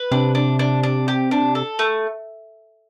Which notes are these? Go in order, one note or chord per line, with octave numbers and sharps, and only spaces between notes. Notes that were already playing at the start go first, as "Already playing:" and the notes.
Already playing: B4
C3 D4
D4
D4
D4
G4
D4
A4
A3